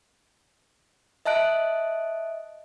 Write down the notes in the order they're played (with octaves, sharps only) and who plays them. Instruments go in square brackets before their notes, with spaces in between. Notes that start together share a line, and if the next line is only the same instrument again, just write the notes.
[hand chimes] D#5 E5 A5 F#6 D7